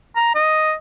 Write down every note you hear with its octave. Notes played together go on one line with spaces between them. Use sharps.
A#5
D#5